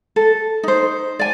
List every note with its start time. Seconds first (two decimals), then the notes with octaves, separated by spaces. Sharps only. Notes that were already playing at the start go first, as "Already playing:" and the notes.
0.16 A4
0.63 D#4 C5
1.19 D5 G#5